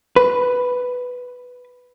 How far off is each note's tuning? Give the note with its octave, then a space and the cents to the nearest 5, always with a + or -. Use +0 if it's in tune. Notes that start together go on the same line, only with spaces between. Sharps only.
B4 +5